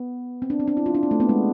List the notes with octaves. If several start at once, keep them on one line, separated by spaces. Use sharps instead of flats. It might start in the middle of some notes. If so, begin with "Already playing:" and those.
Already playing: B3
C4
D4
C4
D4
E4
F4
D4
C4
A3
B3
G#3